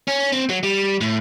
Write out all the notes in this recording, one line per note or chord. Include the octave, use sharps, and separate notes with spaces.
C#4
C4
F#3
G3
A2